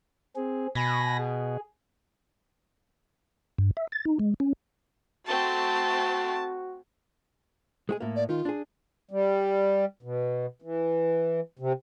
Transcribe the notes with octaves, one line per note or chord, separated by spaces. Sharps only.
C4 G#4
B2 G#5 B5 A#6
G#4
G2
E5
A6
D#4
G#3
C#4
A3 C4 F#4 A5
G#3 F#4 G#4
A2 A#3
D5
D#3 F4
D4 G#4
G3
B2
E3
C3